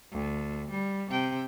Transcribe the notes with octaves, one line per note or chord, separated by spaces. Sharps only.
D2
G3
C3 G5